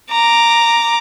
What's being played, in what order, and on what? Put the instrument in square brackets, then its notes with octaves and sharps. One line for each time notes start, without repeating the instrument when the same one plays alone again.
[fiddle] A#5 D6